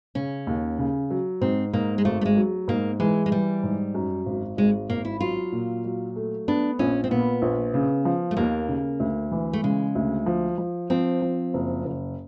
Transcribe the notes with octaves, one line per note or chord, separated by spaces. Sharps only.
C#3 C#4
D#2
C#3
F#3
G#2 C4
G#2 A#3
G#3
G#1 A3
A3
G#3
F#3
G#2 A#3
E3 G#3
G#3
E3 G3
G#2
F#2
G#1
G#1 G#3
G#1 A#3
E4
F#3 F4
A#2
F#3
A3
B3 D4
A#1 C#4
C4
A#2 B3
A#1
C#3
F3
A3
D#2 A#3
C#3
D2
E3
A3
C#3 G#3
D2
F3
F3
F3 C4
F3
F#1
F#1